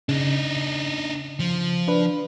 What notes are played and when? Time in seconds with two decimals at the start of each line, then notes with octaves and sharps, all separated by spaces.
0.09 C#3 D4 D#4
1.40 F3
1.88 D4 B4